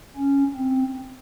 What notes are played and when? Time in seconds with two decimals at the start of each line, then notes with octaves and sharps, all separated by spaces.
0.16 C#4
0.56 C4